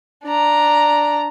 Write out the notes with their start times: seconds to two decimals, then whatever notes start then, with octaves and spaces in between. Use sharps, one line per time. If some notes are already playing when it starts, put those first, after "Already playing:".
0.24 D4 A#5